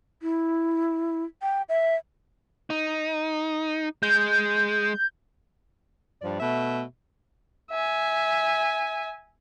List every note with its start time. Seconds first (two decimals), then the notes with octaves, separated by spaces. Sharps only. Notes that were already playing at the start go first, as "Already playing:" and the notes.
0.22 E4
1.42 G5
1.69 E5
2.70 D#4
4.03 G#3 G6
6.21 G2 F3 D5
6.39 B2 A3 E5
7.71 E5 G#5